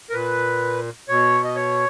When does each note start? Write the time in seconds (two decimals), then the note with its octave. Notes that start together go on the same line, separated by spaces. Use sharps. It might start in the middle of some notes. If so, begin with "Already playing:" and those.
0.10 A#4
0.14 A#2 B4
1.08 B2 C#5
1.44 D#5
1.56 C#5